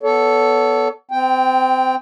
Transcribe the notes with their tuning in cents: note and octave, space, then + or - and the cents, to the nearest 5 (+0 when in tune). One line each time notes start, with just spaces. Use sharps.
B3 +0 A4 +0 C#5 +40
C4 -25 G5 +5